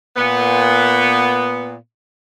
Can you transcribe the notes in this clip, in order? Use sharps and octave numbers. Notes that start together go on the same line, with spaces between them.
A#2 B3